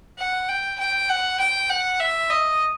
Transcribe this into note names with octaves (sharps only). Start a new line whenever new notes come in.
F#5
G5
G5
F#5
G5
F#5
E5
D#5